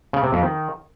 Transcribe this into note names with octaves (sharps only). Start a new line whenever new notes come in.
C#3
C3
F2
D#3